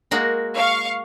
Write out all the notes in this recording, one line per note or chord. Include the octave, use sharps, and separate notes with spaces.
G#3 A#3 F#4
F5 C#6